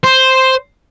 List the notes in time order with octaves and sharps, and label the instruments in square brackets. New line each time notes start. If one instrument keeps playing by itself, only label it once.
[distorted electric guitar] C5